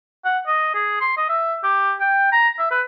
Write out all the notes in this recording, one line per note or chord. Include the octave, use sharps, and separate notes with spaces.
F#5
D#5
G#4
C6
D#5
E5
G4
G5
A#5
E5
B4